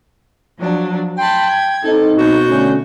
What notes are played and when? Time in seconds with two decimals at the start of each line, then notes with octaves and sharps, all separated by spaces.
0.59 F3 F#3 D4
1.18 G5 A5 B5 C6
1.51 G#6
1.83 C4 D#4 A4
2.18 B2 F#4 G6
2.48 D3 A3 C#4